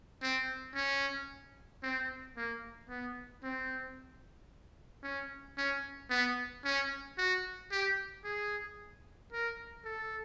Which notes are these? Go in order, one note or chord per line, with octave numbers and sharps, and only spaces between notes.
C4
C#4
C4
A#3
B3
C4
C#4
C#4
B3
C#4
F#4
G4
G#4
A#4
A4